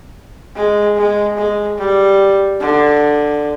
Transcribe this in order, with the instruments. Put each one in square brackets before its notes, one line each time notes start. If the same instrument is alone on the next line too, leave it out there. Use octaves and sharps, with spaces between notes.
[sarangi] G#3
G#3
G#3
G3
D3